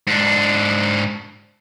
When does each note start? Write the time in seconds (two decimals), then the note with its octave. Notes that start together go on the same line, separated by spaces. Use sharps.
0.07 G#2 D4